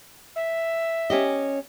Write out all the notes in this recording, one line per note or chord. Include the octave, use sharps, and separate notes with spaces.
E5
C#4 G4 D#5